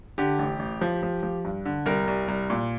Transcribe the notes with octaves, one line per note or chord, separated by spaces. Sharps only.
D3 G4
A1
A1
F3
F3
F3
G2
D3
C2 A#4
C2
C2
A#2